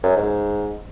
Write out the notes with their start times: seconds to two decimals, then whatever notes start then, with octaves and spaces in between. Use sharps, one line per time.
0.03 F#2
0.17 G#2